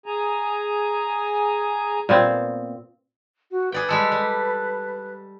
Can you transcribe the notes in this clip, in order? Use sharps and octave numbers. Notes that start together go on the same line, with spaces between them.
G#4 G#5 A#5
A#2 B3 C4
F#4
G#4 B4 D5 G5
G3 G#3 A4
G3